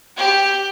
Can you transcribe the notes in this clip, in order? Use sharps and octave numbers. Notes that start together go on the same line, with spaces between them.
G4